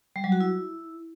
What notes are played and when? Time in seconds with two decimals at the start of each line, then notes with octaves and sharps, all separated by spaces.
0.16 G3
0.24 F#3
0.32 F#4
0.40 E4